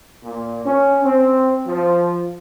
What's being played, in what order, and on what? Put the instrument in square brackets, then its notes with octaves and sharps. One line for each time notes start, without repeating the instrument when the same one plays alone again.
[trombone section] A#2
C#4
C4
F3